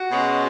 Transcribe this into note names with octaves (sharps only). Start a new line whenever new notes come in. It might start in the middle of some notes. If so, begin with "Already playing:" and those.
Already playing: F#4
B2 G#3 C#4